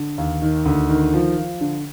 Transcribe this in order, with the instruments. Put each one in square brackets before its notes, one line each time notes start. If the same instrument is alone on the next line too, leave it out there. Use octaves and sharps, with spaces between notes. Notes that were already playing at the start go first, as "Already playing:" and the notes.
Already playing: [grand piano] D3
D#2
D#3
D2
D#3
F3
F3
D3